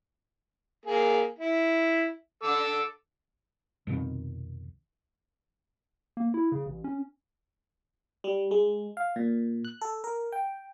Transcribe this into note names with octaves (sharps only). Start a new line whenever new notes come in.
A#3 G#4
E4
A4 D6 E6
C2 F2 B2 D#3
A#3
E4
C#3
A1
C#4
G3
G#3
F5
A#2
F#6
A4
A#4
G5